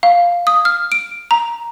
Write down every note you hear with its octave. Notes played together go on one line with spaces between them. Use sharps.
F5
D#6
F6
D7
A#5